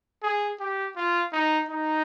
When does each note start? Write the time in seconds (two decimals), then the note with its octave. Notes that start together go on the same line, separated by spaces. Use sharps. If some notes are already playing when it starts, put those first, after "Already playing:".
0.23 G#4
0.60 G4
0.96 F4
1.33 D#4
1.69 D#4